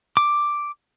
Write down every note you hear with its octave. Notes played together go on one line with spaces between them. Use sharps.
D6